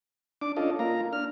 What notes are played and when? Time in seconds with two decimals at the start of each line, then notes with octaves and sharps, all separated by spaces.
0.42 D4 D6
0.57 C#4 D4 F4 A4 D#5
0.79 A#3 F4 A#5
1.13 D4 F6